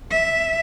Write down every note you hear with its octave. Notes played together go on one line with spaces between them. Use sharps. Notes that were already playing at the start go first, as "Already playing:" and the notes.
E5